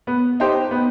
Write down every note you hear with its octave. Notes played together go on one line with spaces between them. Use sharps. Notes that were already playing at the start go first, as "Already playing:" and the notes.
B3
D#4 G4 C5
B3